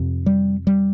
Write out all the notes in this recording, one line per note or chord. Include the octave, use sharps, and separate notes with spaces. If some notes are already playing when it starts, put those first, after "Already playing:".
Already playing: F2 C3
G3
G3